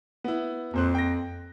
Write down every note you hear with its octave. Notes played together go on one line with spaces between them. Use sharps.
B3 E4
F2 A#2 C5 F#6
G5 A#6